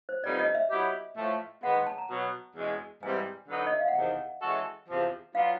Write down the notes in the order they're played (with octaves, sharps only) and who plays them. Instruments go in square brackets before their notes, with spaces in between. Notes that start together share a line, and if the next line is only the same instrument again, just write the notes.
[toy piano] C5
[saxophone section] F2 D3 G3 B3 D#4 [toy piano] D5
[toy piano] D#5
E5
[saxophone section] F#3 B3 E4 G4
A2 F3 A3
[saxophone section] D#3 G#3 B3 [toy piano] F#5
[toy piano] G5
A5
A#5
[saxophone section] B2 F#3 B3
E2 B2 G#3 C#4
[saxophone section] G#2 E3 G3 C4 [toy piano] G#5
[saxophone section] D3 F#3 B3 D#4
[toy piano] D#5
E5
F5
F#5
[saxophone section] E2 C3 D#3 [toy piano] G5
[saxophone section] E3 G#3 C#4 F#4 A4
E2 C3 F3
[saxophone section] F#3 B3 D4 F4 [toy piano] F5